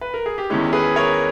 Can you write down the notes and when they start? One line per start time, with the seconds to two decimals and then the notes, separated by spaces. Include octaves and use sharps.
0.01 B4
0.14 A#4
0.26 G#4
0.38 G4
0.50 E2 D#3 G#3 C#4 E4
0.73 G#4 B4
0.96 A#4 C#5